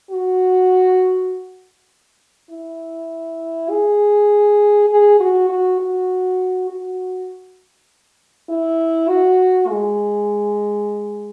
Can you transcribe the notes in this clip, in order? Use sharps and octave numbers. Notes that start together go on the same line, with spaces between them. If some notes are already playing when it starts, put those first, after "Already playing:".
F#4
E4
G#4
G#4
F#4
F#4
F#4
F#4
E4
F#4
G#3